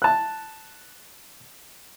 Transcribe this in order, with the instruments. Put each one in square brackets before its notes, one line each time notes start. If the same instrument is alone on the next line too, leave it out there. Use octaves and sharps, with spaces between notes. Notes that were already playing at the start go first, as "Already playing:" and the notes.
[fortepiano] A5 F#6